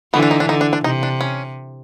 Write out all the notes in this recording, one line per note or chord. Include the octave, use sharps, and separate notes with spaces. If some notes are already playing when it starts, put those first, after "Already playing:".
D3 E3 B3
D4
D#4
D4
D3 D#4
D4
D4
C3 D#4
D4
C#4